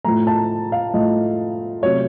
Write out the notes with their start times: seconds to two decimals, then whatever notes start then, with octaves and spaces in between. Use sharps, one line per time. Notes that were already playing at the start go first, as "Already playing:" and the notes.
0.04 A2 F3 A3 A#5
0.27 A5
0.72 F5
0.94 A2 F3 A3 D#5
1.83 C3 F#3 A3 C#5